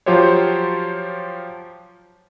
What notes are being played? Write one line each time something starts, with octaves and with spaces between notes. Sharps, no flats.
F3 F#3 F4 G4 C5 C#5